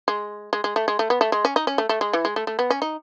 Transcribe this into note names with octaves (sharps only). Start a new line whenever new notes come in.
G#3
G#3
G#3
A3
G#3
A3
B3
A3
G#3
C#4
D#4
C#4
A3
A3
G#3
E3
G#3
A3
A3
B3
C#4
D#4